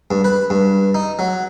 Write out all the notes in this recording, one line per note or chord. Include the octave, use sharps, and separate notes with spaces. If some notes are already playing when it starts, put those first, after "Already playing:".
G2
B4
G2
D#4
F#3